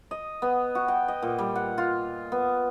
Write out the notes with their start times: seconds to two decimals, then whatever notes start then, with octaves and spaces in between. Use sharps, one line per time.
0.11 D#5
0.42 B3
0.75 F#4
0.88 G5
1.08 D#5
1.22 A#2
1.38 G3
1.55 F#5
1.78 F4
2.32 B3